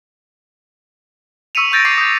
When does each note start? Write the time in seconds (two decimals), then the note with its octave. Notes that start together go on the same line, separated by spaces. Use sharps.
1.55 C#6 E6 B6 C#7 D#7 F7
1.72 C#6 E6 G6 A6 A#6 D7
1.85 C#6 D6 A#6 C7 D#7
1.98 D#6 G6